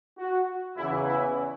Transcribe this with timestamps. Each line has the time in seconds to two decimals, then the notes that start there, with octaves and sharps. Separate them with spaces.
0.18 F#4
0.77 E2 C#3 E3 E4
1.07 E4